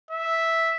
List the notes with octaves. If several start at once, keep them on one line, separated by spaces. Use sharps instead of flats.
E5